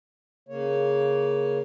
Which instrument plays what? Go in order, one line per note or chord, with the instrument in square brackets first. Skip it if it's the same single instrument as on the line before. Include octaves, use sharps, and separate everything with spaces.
[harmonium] C#3 A#3 C#5